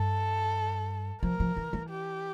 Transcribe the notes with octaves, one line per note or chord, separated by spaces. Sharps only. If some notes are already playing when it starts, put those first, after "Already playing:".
Already playing: G2 A4
F3 A#4
F3
E3
E3
G4